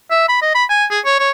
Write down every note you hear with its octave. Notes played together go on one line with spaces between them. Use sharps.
E5
B5
D#5
B5
G#5
G#4
C#5
C#5